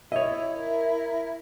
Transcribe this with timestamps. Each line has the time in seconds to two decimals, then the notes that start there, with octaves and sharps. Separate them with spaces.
0.12 E4 C#5 D#5 E5
0.57 A#4